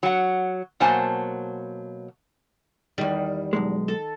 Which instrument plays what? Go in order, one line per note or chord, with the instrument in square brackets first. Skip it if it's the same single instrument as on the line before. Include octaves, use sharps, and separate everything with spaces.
[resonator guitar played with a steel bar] F#3 F#5
B2 F#3 A#3 C5 G#5 A5
[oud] E2 G3 [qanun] D#3
[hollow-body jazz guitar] B1 F2 G#3
[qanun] A4